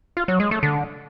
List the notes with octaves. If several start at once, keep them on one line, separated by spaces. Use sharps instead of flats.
F4
F#3
G#3
A3
D3